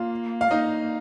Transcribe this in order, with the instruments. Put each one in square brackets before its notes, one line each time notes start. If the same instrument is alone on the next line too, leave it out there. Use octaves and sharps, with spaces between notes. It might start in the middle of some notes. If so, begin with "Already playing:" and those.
Already playing: [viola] A#3 [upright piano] F4
[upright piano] F5
[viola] A#3 [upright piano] D#4 D#5